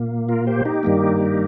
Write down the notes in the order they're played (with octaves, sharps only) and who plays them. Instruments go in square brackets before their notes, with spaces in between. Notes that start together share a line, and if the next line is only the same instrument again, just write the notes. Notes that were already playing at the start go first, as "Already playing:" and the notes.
Already playing: [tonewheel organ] A#2 A#3
F4 A#4
G4 C5
D#4 G4
G2 D#3 G3 A#3